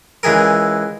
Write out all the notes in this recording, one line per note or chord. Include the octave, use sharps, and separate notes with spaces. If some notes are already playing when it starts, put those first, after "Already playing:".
C#2 E3 G#4 A#4